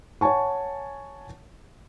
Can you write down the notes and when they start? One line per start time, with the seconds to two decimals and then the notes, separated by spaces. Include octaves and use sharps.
0.21 C#5 F#5 G#5 A5 C#6